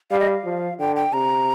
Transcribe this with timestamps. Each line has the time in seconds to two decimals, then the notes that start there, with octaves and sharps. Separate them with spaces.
0.11 G3 F5
0.20 D#5
0.28 F5
0.45 F3
0.79 D3 G5
0.96 G5
1.13 C3 A#5